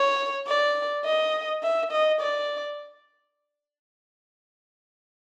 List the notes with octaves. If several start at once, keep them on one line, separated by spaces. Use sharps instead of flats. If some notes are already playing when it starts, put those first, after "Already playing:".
Already playing: C#5
D5
D#5
E5
D#5
D5